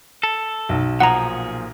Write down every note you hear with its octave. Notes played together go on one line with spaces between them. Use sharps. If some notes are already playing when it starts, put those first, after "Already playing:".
A4
B1
A#2 F3 G#4 F#5 A#5